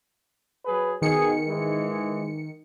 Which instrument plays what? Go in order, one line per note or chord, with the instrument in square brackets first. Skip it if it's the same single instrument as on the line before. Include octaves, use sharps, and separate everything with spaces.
[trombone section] F#3 G#4 B4
[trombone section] B2 G#4 [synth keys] D#3 C#7
[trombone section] G#2 E3 G#3